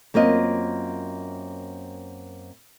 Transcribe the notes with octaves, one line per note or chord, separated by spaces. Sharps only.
F#2 A#3 C4 F4 D#5